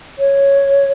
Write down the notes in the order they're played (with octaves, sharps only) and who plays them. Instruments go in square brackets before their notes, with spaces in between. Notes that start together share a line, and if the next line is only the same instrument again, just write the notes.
[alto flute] C#5